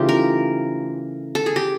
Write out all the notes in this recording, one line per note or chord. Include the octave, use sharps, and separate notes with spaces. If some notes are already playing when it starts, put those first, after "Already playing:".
Already playing: C#3 E3 A3 D#4 F4 G4
A#4
A4
G#4
G4